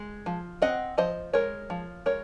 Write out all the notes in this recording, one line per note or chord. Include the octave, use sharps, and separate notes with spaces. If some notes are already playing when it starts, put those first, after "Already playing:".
Already playing: G#3
F3
C4 D#5 F#5
F3 C5 D#5
G#3 A#4 C#5
F3
G#3 A#4 C#5